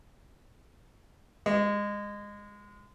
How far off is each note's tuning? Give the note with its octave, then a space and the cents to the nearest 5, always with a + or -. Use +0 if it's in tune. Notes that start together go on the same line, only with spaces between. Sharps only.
G#3 -20